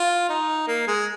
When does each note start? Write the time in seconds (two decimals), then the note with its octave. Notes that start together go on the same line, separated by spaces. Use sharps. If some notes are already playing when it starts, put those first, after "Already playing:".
Already playing: F4
0.29 D#4
0.68 A#3
0.87 G#3